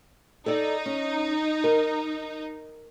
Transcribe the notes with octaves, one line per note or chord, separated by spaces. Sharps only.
D#4 A4 D5
C#4
A#4